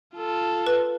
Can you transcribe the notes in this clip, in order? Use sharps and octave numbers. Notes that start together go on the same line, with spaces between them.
F4 A4
B4